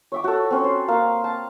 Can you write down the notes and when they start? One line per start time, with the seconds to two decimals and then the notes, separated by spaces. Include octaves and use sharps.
0.12 C#5 E5 D6
0.24 F#4 A4
0.51 C4 C#4 C#5
0.64 C5
0.88 A#3 F5
1.24 A5